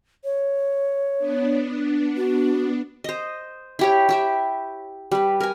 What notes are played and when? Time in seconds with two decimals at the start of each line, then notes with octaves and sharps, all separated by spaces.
0.24 C#5
1.18 B3 D4
2.17 F#4
3.04 C5 D#5
3.79 E4 G4 C#5
4.09 E4 G4 E5
5.11 G3 B4
5.40 A#4 G#5